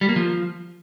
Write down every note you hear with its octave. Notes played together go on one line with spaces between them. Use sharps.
G3
A#3
F3